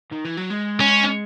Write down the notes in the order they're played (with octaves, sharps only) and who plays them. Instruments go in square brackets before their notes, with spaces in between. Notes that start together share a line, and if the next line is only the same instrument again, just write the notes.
[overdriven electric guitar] D#3
E3
F#3
G#3
[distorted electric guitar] C#4